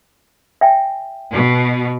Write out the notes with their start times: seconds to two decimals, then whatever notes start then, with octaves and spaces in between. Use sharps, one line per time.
0.61 E5 G5 G#5
1.32 B2